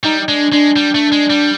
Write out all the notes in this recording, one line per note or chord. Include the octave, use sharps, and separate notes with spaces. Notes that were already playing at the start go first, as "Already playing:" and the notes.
G3 D#4
D#4
G#3 D4
G#3 D4
G3
A3
G#3
G3